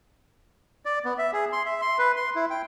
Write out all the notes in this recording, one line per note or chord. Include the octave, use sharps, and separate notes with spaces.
D5
B3
E5
G#4
C6
E5
C6
B4
C6
E4
G5